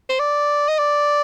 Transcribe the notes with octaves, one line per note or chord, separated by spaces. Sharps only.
C5
D5
D#5
D5